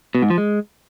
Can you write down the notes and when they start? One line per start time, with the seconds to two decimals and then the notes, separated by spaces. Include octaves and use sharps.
0.15 B2
0.22 G#2
0.30 F3
0.38 G#3